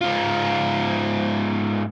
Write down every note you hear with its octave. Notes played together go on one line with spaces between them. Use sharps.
G#2 F4